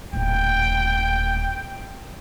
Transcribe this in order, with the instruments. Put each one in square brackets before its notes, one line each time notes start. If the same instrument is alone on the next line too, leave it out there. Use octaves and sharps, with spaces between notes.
[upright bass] D#1 A2 [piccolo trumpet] G5